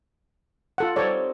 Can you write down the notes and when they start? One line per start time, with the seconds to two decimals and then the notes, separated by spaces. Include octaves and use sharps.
0.78 F4 A4 F#5
0.96 G3 C4 D#4 A4 C#5 D5